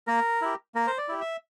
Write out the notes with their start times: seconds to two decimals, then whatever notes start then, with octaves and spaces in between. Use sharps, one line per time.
0.07 A#3 A#4
0.42 E4 G4
0.75 A#3 A#4
0.87 C5
0.98 D5
1.08 E4 G4
1.21 E5